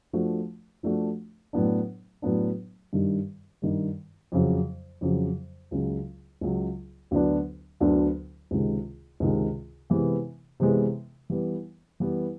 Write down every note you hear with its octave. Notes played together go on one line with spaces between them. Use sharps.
F3 A3 D4 F#4
F3 A3 D4 F#4
A2 F#3 B3 D4
A2 F#3 B3 D4
G2 D#3 G3
G2 D#3 G3
F2 C#3 F#3
F2 C#3 F#3
C#2 C#3 F#3
C#2 C#3 F#3
D2 D3 F#3 B3 D4
D2 D3 F#3 B3 D4
C#2 C3 D#3 G#3
C#2 C3 D#3 G#3
C3 E3 G#3 B3
C3 E3 G#3 B3
E3 G3 B3
E3 G3 B3